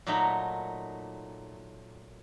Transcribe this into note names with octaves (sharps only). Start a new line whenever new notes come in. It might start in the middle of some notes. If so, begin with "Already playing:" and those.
A#2 F#3 A3 D#4 A#5 B5